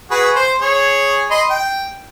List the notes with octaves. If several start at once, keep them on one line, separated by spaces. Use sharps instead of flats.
F#4 G#4 B4
C5
G#4 C#5
D#5 B5 C6
G5